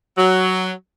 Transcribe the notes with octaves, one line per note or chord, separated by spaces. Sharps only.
F#3